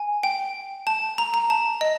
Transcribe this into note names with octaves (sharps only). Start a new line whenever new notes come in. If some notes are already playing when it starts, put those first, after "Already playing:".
Already playing: G#5
G5
A5
A#5
A#5
A5
D#5